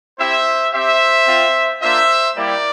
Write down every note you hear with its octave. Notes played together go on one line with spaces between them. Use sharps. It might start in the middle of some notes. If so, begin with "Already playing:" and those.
C4 E4 G4 C5 E5
C4 G4 C5 E5
C4 F4
A#3 D4 F4 C5 E5
G3 A#3 E4 G4 A#4 D5